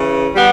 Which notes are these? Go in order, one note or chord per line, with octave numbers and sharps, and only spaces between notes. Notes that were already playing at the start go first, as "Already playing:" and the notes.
Already playing: C#3 E3
G3 B3